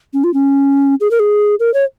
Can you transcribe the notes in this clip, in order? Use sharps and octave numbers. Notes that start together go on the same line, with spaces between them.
C#4
F4
C#4
G#4
A#4
G#4
A#4
C#5